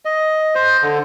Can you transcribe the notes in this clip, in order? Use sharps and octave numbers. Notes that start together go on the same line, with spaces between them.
D#5
C5
D3